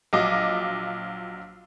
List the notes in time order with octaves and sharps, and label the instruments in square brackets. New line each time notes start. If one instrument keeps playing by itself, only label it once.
[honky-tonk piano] A#1 F#3 F4 D#5 D6